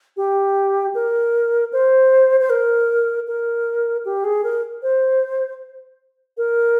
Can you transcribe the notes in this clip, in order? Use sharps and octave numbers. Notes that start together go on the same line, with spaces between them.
G4
A#4
C5
C5
A#4
A#4
G4
G#4
A#4
C5
A#4